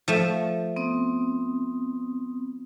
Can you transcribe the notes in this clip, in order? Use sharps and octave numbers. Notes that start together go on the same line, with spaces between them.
F3 A3
B3 C4 D#6